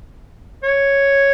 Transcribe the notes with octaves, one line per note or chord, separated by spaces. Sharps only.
C#5